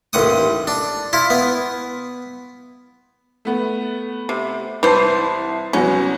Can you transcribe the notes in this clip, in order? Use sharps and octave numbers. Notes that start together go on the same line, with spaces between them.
A1 D#2 F#5 D#6
D4
E4 F4
B3
A3 B3
C3
C2 E3 C5 A5 C7
C2 F#3 B3 C#4